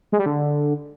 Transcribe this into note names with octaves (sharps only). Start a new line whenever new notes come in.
G#3
G3
D3